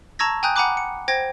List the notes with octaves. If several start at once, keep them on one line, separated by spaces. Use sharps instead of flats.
A5 A#5 C#6 E6 G#6 A#6
G5 G#5 A#5 D#6 F#6 G6
F#5 G#5 A#5 B5 D6 F#6
C#7
C5 G5 G#6 A#6